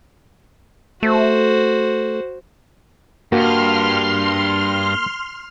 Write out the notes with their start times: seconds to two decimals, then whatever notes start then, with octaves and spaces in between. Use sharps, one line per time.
1.03 A3 F#4 C5
3.32 G2 A#3 F#4 C6 F6